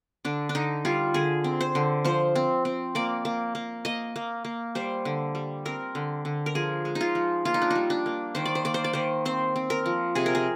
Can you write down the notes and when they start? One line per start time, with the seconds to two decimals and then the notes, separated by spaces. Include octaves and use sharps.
0.25 D3 D4
0.49 D4
0.55 D3 D#4
0.85 G3 F4
1.14 D3 G#4
1.44 C4
1.61 C5
1.75 D3
2.05 F3 C5
2.35 C4
2.65 C4
2.95 A#3 D5
3.25 A#3
3.55 A#3
3.85 A#3 D#5
4.16 A#3
4.45 A#3
4.75 G3 C5
5.05 D3
5.35 G3
5.65 C4 A#4
5.95 D3
6.25 D3
6.46 A#4
6.55 F3 G#4
6.85 G#3
6.95 D#4
7.01 F4
7.15 F3
7.45 A#3 F4
7.54 D#4
7.62 D4
7.70 G3 D#4
7.90 D4
8.06 A#3
8.35 D#3 C5
8.45 D5
8.55 C5
8.65 A#3 D5
8.74 C5
8.84 D5
8.93 D#3 C5
9.25 C4 C5
9.56 C4
9.70 A#4
9.86 F3
10.15 C3 G#4
10.26 A#4
10.35 G#4